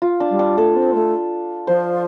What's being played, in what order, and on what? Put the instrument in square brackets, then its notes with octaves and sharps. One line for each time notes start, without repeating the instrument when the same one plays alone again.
[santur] F4
D4
[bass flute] G3
[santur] D4
[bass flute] A3 [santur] A4
[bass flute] C4
A3
[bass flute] F3 [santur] C5